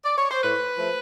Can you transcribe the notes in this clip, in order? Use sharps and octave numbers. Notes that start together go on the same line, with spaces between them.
D5
C#5
C5
A2 B4
F3 A3